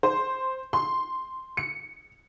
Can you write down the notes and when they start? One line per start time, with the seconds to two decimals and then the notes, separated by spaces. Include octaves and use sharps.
0.03 C5
0.73 C6
1.57 C#7